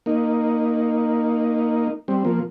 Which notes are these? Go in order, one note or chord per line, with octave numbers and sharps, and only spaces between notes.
A#3 D#4
G3 C4
F3 A#3